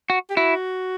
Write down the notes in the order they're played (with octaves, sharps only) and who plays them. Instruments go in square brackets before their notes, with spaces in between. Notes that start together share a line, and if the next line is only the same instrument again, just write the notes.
[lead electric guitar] F#4
[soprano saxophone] G4
[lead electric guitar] E4 [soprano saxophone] F#4